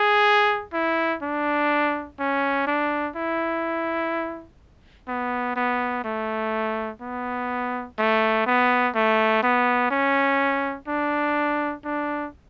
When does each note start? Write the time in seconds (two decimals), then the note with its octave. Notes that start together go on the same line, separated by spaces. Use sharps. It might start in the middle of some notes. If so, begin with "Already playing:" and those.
Already playing: G#4
0.73 E4
1.22 D4
2.19 C#4
2.67 D4
3.16 E4
5.08 B3
5.56 B3
6.04 A3
7.01 B3
7.99 A3
8.46 B3
8.95 A3
9.43 B3
9.91 C#4
10.88 D4
11.85 D4